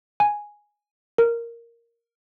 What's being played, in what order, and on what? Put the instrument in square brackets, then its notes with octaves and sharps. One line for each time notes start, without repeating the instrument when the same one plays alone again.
[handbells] G#5
A#4